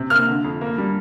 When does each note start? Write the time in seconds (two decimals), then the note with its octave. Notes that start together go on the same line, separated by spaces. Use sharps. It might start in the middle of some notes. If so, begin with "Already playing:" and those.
Already playing: C3
0.10 A#3 F6
0.28 D3
0.44 F2
0.61 A#3
0.78 G3